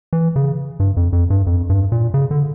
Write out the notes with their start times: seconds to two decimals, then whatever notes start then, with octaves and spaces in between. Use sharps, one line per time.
0.13 E3
0.36 C#3
0.80 G2
0.97 F2
1.13 F2
1.30 G2
1.47 F2
1.70 G2
1.92 A#2
2.14 C#3
2.31 D3